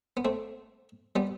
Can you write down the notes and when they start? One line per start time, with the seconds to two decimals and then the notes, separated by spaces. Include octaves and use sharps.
0.17 B3
0.25 A3 C4
1.16 G3 B3